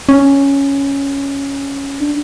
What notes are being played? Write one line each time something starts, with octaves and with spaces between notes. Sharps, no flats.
C#4
D4